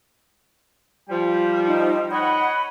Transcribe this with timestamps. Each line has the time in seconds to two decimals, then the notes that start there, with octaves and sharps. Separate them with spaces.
1.10 F3 G3 G5
1.67 D#4
2.11 C#5 D#5 F#5 B5